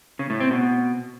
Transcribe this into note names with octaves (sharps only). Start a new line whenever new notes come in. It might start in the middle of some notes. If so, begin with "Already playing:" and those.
C#3
A2
C4
B2